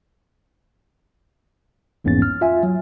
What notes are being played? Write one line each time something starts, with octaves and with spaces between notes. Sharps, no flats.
A#1 E2 G#2 A#3 C#4 A6
F6
F4 E5 G#5
F#3